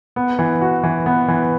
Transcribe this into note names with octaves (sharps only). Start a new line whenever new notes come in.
B3
E3
F#4
E3
B3
E3